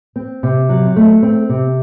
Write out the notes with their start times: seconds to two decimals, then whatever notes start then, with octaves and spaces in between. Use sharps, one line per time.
0.16 C4
0.43 C3
0.69 F#3
0.96 A3
1.23 C4
1.49 C3